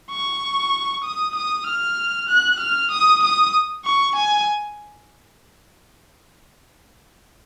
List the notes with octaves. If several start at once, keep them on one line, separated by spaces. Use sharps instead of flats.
C#6
D#6
D#6
F6
F#6
F6
D#6
D#6
C#6
G#5